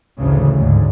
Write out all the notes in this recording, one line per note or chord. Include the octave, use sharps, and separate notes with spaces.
A1 D2 A2 C#3
D2 G#2